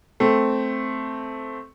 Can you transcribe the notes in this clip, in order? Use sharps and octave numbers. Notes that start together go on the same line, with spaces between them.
A3 C4